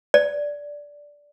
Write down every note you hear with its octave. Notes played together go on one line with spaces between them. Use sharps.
D5